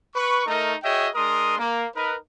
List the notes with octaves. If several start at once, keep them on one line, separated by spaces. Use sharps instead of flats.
B4 C#6
A3 D#4 A#4
F#4 G#4 C#5 D#5 E5 G5
G#3 D4 A#4 C6 D#6
A#3
D#4 A#4 B4